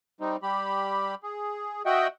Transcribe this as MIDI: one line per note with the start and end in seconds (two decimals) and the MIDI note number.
0.20 0.37 55
0.20 0.37 60
0.20 0.37 63
0.42 1.15 55
0.42 1.15 67
0.42 1.15 83
1.23 1.82 68
1.86 2.07 66
1.86 2.07 75
1.86 2.07 76
1.86 2.07 78
1.86 2.07 79